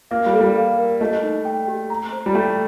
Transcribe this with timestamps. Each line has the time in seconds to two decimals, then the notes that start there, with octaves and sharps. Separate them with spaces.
0.11 A#3 F5
0.26 G3
0.33 A4
0.41 G3
0.56 F5
0.78 A#4
1.01 A3 D#5
1.23 D#4
1.45 G5
1.68 G4
1.90 A#5
2.12 C5
2.26 G3
2.34 A3 G5